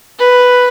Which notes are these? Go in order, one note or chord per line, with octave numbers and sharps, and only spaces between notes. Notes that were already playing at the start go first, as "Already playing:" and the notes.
B4